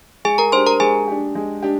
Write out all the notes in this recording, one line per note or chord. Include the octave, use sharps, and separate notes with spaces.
G#3 G#4 G#5
A#4 A#5
D4 G4 C5 C6
A#4 A#5
G#3 G#4 G#5
D4 G4
G#3
D4 G4